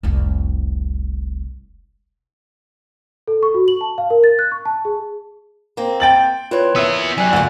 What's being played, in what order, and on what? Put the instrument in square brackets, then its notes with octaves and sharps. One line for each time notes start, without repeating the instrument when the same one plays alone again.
[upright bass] F1 C2
[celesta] A4
C#6
F#4
F#7
A5
F5
A#4
A6
F#6
C#6
A5
G#4
[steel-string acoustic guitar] A#3 C4
[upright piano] G5 A6 F#7
[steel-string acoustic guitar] A#2 E4 [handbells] F4 B4 C#5
[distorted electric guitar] B3 E5 [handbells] D#6 [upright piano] E6
[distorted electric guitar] F#2 [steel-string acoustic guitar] G3 [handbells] G#5 F#6
[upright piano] D2 [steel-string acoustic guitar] F4 F#5